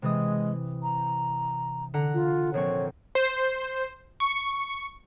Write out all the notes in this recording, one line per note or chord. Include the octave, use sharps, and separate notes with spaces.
C3 E3 G#3 D#6
A#5
D3 F#5 A#5
F4
A#1 C4 C#5 C#6
C5
C#6